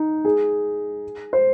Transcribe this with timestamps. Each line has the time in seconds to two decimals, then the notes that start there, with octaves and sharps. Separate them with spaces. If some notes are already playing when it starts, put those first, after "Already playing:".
Already playing: D#4
0.25 G#4
1.33 C5